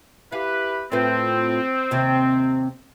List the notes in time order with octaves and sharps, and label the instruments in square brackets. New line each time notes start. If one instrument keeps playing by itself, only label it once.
[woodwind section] E4 G4 B4 [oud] F5
[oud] A2 F4 B4 [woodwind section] C4
[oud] D#2 C3